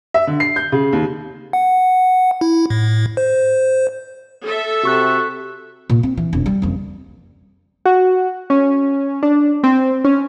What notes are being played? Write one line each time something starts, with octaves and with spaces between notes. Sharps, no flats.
E5
D3
C7
G6
C#3
D#2
F#5
E4
A2
C5
A4 E5
C3 F#4 C#6 F#6
A#2
C4
E3
E1 F2
G3
F#1 F2
F#4
C#4
D4
C4
C#4